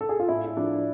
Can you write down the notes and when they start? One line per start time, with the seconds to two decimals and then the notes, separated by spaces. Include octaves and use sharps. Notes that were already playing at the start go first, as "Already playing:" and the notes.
0.01 A4
0.09 G#4
0.20 F4
0.28 A2 E4
0.57 F3 D4